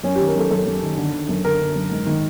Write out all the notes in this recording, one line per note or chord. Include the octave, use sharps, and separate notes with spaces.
F#2 C#4
D#3 G4
A#4
F#2 A4
F#2 A4
F#2
D#3
D3
D3
F#2
D3 A#4
D3
F#2
G#2
D#3